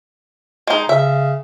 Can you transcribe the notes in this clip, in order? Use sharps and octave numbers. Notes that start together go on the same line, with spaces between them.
G#3 D#4
C#3 E5